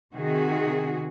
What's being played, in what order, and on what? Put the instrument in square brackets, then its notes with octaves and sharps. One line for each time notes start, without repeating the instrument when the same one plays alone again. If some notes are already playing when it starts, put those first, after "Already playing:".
[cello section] C3 D#3 F#4 G#4